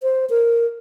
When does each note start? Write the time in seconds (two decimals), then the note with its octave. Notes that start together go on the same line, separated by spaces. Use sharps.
0.03 C5
0.30 A#4